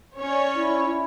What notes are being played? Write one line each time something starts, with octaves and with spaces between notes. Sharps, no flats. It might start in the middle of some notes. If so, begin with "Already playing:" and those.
C#4 C#5 D5
E4
E4